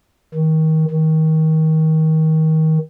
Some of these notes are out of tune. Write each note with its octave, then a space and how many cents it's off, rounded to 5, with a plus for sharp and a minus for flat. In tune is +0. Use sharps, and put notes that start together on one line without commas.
D#3 +25
D#3 +25